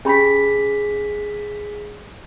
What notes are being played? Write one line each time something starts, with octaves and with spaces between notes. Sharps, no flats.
C#4 G4 G#4 B5 B6